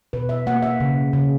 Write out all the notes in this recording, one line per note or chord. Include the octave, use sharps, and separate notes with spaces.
B2 B4
E5
A#3 F#5
E5
C#3
C#3